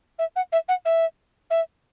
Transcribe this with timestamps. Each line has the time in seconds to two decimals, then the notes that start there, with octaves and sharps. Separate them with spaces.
0.18 E5
0.36 F#5
0.52 E5
0.68 F#5
0.85 E5
1.50 E5